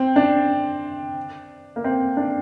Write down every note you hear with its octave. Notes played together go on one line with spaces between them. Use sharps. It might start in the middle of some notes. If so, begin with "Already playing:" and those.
Already playing: C4
D4
A#3
C4
D4